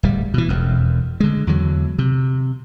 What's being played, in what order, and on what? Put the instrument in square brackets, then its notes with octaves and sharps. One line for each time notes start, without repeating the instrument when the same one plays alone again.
[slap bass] D1 G3
B2 E3
E1 F2
D3 G#3
E2 D3 F#3
C3